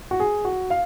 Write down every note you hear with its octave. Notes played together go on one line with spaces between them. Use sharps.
F#4
G#4
F#4
F5